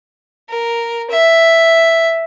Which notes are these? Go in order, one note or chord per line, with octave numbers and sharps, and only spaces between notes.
A#4
E5